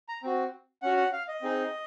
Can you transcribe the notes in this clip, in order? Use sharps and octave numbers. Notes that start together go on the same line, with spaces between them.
A#5
C4 F#4
C#4 F#4 F#5
F#5
F5
D#5
C4 D#4 G#4